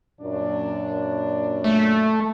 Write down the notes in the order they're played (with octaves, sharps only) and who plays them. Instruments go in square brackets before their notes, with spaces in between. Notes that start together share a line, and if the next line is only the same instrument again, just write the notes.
[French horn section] F#2 A#2 D4
[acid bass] A3